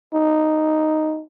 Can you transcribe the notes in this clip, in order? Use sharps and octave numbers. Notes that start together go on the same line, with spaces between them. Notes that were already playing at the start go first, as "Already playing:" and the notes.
D#4